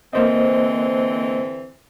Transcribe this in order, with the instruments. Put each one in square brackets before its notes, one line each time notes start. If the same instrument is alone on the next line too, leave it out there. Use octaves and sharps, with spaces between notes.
[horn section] D3 E3 C4 [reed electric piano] A#3 C5 D#5